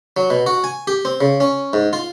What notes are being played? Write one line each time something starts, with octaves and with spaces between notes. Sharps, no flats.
F#3
B2
F#4
G#5
G4
C4
C#3
C#4
G#2
F4